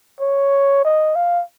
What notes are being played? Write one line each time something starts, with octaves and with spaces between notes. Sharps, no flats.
C#5
D#5
F5